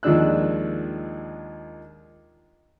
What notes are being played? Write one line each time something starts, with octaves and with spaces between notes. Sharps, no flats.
D#2 F3 G#3 D4 E6 F#6